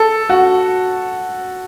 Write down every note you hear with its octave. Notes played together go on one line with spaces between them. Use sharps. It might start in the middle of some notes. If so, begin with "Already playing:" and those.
Already playing: A4
F#4